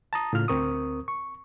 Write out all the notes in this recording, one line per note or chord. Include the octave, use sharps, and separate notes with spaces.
A5 A#5 D#6
A2 C#3 F4 F6
D2 C4 A#4 C#6 D#6
C#6